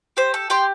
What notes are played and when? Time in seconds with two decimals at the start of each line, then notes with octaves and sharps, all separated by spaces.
0.17 G4 C5
0.34 A4
0.50 G4 G5 C6